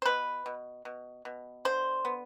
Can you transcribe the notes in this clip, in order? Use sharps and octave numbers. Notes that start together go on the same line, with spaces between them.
C5
B2 B4
B2
B2
B2
D3 C5
B3